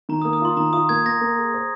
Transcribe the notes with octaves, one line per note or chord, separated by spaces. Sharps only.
D#3 A#5
D#6
A#3
D#6
F4 C6
D#3 A#5
F4 D#6
A#3 G#6
A#3 A#6
A#3
G#4
C5